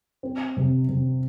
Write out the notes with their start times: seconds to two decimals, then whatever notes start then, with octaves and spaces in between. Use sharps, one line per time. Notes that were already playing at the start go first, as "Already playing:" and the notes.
0.23 C4
0.57 C3
0.88 C3